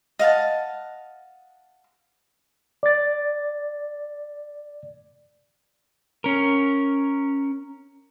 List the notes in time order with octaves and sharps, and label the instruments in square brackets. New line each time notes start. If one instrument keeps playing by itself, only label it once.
[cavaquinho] D#5 F5 F#5 A5
[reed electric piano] D5 A6
[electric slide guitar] C#4 A#4